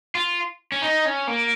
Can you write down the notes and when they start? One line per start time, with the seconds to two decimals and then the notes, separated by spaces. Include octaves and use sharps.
0.15 F4
0.72 C#4
0.82 D#4
1.05 C#4
1.27 A#3